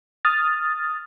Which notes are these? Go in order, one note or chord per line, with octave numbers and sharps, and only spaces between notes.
D#6 F6 A6